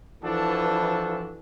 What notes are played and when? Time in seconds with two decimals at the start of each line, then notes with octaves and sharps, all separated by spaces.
0.24 E3 F3 D4 F#4 A4